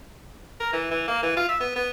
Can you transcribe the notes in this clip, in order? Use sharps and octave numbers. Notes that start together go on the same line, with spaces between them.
A#4
E3
E3
A#3
E3
F4
E5
B3
B3